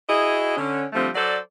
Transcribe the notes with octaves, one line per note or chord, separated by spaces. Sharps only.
E4 F#4 G#4 D#5
D3 C#4
D3 F3 G3 A3 C4
F#3 A4 C5 D5